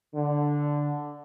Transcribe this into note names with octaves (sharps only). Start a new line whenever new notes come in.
D3